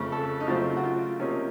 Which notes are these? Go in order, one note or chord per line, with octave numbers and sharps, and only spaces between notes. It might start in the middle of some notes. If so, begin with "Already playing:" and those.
Already playing: F2 C#3 A3
A4
D#4
C#3 F#3 A3 C4 F4
F#4
F4
C3 F3 A#3 C#4 D#4